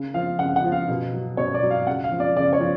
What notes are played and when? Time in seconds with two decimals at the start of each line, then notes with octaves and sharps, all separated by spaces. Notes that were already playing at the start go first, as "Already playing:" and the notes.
Already playing: C#3
0.14 F3 F5
0.39 C#3 F#5
0.56 F#5
0.64 F3
0.72 F5
0.89 B2
1.13 F#3
1.37 B2 C#5
1.54 D5
1.62 F#3
1.70 F5
1.87 C#3 F#5
2.04 F5
2.12 F3
2.20 D5
2.36 C#3 D5
2.53 C#5
2.61 F3